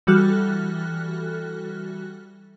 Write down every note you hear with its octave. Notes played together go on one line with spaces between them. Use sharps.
E3 G3 F#4 A4 F6 F#6